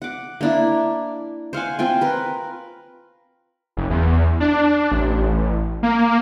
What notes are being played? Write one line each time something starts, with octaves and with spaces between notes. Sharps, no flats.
F#5 D6
A#3 D4 E4
C5 F5 F#5 G#5
C4 F4 G5 G#5
A#4 B4
F#1
E2
D4
A1
A#3